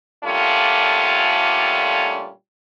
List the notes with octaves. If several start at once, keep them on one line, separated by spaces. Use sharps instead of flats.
A#2 D3 G3 A3 C#4 F4